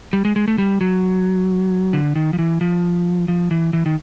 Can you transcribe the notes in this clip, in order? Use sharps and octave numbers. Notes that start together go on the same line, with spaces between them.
G3
G#3
G#3
A3
G3
F#3
D3
D#3
F3
E3
F3
F3
E3
E3
D#3